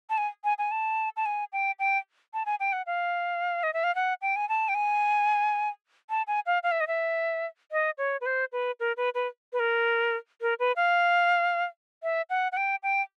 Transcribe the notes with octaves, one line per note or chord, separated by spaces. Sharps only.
A5
G#5
G#5
G#5
A5
A5
G#5
G5
G5
A5
G#5
G5
F#5
F5
D#5
E5
F5
F#5
G5
G#5
A5
G5
G#5
A5
G#5
F5
F5
E5
D#5
E5
D#5
C#5
B4
C5
B4
A#4
B4
B4
B4
A#4
A#4
B4
F5
E5
F#5
F#5
G5
G5